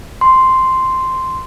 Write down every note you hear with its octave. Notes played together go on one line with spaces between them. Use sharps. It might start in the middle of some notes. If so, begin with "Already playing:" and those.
C6